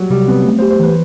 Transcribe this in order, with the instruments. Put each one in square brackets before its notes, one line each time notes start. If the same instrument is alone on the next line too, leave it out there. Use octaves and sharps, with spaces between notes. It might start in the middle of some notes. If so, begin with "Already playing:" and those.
Already playing: [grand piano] F#3 G3
[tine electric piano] C3 [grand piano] G3
[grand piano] B3 [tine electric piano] C4
[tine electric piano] A3
[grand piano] C5
[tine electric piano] G4
[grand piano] C5
[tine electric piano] E3 [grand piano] B4